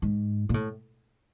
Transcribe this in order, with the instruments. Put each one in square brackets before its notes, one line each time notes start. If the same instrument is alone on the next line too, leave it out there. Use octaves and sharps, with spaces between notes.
[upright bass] G#2
A#2
A2